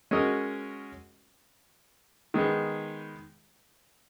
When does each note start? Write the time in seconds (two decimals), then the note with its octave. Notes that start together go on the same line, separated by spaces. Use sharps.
0.11 G#3 C#4 F#4 A#4 D#5
2.34 D#3 G#3 B3 D#4